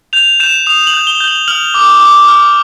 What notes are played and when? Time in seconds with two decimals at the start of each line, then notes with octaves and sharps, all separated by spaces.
0.13 G6 F7
0.40 G6 E7
0.66 D#6 F7
0.87 F#7
0.94 G6
1.07 G7
1.20 G6
1.27 F#7
1.48 F6 F#7
1.74 D6
2.01 D6
2.28 F6